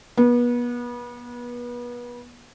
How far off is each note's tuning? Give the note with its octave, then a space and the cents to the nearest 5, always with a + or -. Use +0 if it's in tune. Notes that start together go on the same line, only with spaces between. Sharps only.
B3 -30